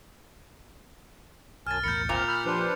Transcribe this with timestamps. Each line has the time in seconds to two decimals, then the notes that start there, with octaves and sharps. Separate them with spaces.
1.67 B1 F#2 G#5 A5 F6 A6
1.84 B1 E2 A2 A#4 A#5 B5 G6 C#7
2.09 G#1 D2 A#2 C4 D6 F6 F7
2.28 B5 E6 F6 G6
2.46 F3 D4 G4 B4 C5 D5